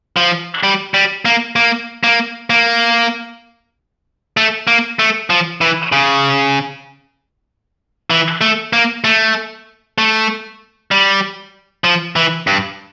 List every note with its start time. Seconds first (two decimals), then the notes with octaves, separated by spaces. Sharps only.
0.17 F3
0.63 G3
0.94 G3
1.25 A#3
1.56 A#3
2.04 A#3
2.50 A#3
4.37 A3
4.67 A#3
4.99 A3
5.30 F3
5.61 E3
5.92 C#3
8.10 E3
8.41 A3
8.73 A#3
9.04 A3
9.98 A3
10.91 G3
11.84 F3
12.16 E3
12.47 G2